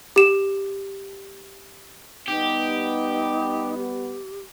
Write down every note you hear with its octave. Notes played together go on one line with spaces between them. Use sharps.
G4 E7
G3 B3 D#4 G4
G4